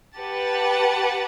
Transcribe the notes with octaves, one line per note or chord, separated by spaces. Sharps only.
G4 B4 F#5 A5